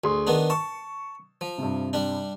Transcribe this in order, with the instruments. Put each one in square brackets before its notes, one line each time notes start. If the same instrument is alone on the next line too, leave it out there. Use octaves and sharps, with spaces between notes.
[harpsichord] D2 [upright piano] G#4 C6
[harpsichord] D#3 B3 D4
[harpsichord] A5 [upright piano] C#6
[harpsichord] F3
[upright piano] G2 C3
[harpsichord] G3 D4